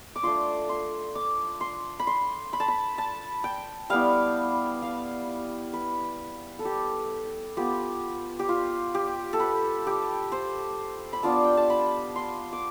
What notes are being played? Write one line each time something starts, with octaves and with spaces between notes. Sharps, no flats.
D6
A3 D4 F4 C6
C6
D6
C6
B5
C6
B5
A5
B5
A5
G5
G3 B3 E4 F5
F5
B4
A4
G4
B3 F4 G4
G4
F4
G4
A4
B4
G4
C5
B5
B3 D4 F4 A5
G5
A5
B5
C6
D6